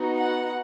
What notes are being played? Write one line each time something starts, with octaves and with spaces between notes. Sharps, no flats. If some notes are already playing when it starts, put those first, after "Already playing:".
Already playing: B3 D#4 F#4
F#5